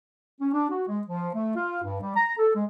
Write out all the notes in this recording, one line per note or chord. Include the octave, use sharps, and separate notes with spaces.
C#4
D4
F#4
G#3
F3
A3
F4
G2
G3
A#5
A4
G#3